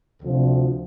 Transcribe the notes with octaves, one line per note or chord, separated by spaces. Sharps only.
D2 C3 F3